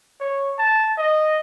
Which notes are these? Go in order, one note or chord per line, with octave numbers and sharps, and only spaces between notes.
C#5
A5
D#5